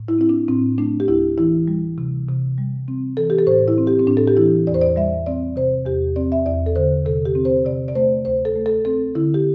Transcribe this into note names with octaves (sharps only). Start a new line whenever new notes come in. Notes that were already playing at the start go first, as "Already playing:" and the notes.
Already playing: A2
E4
C4 E4
D4
A2 C4
A3 D4
G4
D2 E4
E3 E4
G3
C3
C3
G3
C4
E3 A4
G4
A4
A2 C5
E4
C4
G4
C4
A2 D4
A4
G4
E3 E4
E2 D5
C5
D5
G3 E5
C4 D5
C3 C5
E2 G4
C4 D5
E5
E2 D5
A4
D3 C5
C3 A4
G4
C4
C5
C3 D5
D5
A3 C5
D2 C5
A4
A3
A4
C4 A4
D3 E4
G4